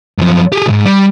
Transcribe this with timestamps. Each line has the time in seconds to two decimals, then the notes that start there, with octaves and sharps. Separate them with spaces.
0.18 F#2 F3
0.52 G4 G#4
0.66 B1 G#2
0.85 G3